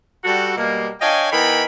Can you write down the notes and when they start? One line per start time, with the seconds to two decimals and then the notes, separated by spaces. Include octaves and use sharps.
0.25 G3 F#4 A4
0.56 B2 G3 G#3 A#3
1.01 D4 C#5 D#5 F5 G5 G#5
1.32 E3 B3 D#4 A#4 G5 B5